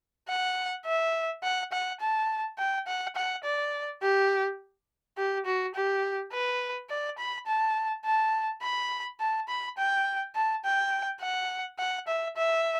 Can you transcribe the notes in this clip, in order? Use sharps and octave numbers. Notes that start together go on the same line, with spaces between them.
F#5
E5
F#5
F#5
A5
G5
F#5
F#5
D5
G4
G4
F#4
G4
B4
D5
B5
A5
A5
B5
A5
B5
G5
A5
G5
F#5
F#5
E5
E5